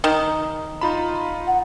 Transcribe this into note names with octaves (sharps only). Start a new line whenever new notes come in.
D#3 A#5 D#6
D#4 F4 A#5 B5
F#5